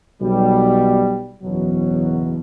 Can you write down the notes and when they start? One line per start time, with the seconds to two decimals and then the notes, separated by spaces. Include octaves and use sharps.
0.21 B1 B2 G3
1.42 F#1 E2 B2 F#3